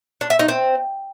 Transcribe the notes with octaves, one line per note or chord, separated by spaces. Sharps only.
D4
E5
D#4
C4